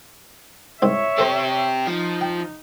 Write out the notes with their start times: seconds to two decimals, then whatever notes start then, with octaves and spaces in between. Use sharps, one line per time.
0.82 C2 G#2 C4 C#5 E5
1.18 C4 G4 A4 C5 A#5
1.87 F3 D#4
2.21 G5